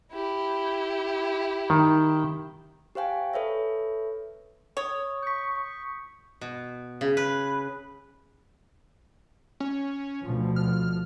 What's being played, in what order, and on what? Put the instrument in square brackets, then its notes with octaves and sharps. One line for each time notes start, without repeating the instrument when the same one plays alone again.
[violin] E4 G4
[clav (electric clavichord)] D#3
[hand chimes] G4 C5 F5 G5 G#5
A4 B4 C#5 E5
[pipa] C#5 [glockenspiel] C#6 D#6
[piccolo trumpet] C#6 [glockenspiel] G6 B6
[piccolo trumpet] C#6
[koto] B2
C#3
B4
[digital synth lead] C#4
[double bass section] D2 B2 F3
[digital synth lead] F6